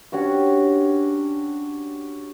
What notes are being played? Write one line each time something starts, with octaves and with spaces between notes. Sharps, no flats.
C#4 D4 F#4 G4